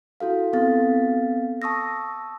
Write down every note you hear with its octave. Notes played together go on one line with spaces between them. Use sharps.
E4 F#4 A4 F5
B3 C4 A4 F5 A6
A5 C#6 D#6 E6 A#6